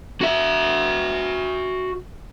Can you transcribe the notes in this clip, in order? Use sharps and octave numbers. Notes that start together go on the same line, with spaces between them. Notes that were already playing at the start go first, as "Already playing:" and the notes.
F#4 E5